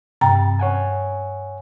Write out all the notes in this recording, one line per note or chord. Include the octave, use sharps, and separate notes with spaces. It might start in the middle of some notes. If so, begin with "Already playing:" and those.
G2 C3 G5 A#5 A6
C#5 F#5 G#5